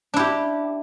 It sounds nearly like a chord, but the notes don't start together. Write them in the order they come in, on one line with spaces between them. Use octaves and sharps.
D4 E4 G4